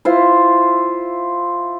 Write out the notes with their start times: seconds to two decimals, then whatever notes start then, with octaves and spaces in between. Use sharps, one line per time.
0.05 E4 F4 C5